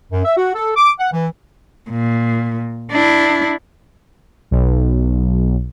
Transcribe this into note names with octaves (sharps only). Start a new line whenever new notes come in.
F#2
E5
F#4
A4
D6
F#5
E3
A#2
D4 E4
B1